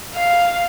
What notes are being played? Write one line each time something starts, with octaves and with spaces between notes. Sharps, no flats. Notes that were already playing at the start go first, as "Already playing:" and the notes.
F5